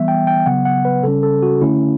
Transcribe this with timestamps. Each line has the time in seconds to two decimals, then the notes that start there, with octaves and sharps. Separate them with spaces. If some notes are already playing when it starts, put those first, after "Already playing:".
Already playing: E3 G3 B3 E5
0.08 G5
0.27 G5
0.46 C#3 F#3 B3 F#5
0.65 F#5
0.85 B4
1.03 C#3 G3 C#4 A4
1.23 A4
1.43 F#4
1.61 D3 A3 C#4 E4